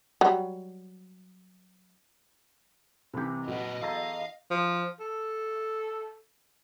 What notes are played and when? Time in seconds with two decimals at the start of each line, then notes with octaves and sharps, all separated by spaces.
0.21 F#3 G3
3.14 C2 C3 E3 G4
3.48 A#2 F#3 B4 D#5
3.82 E2 A4 F5 A#5
4.50 F3
5.00 A4